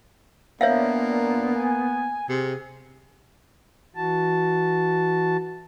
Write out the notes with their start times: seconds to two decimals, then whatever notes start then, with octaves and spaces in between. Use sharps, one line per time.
0.61 A#2 A#3 B3 D4 C#5 E5 F5
1.56 G#5
2.29 C3 G#4
3.96 E3 F#4 A5